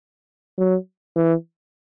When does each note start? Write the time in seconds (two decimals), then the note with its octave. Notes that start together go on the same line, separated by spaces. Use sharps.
0.58 F#3
1.16 E3